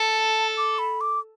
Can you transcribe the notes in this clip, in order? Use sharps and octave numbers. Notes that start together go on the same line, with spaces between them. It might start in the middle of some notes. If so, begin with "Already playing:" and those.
Already playing: A4 A5
D6
B5
D6